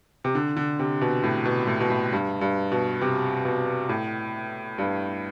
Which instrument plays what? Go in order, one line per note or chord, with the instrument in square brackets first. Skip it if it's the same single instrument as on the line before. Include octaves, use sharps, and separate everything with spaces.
[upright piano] C3
D3
D3
C3
B2
A2
B2
A2
B2
A2
G2
G2
B2
C3
B2
A2
G2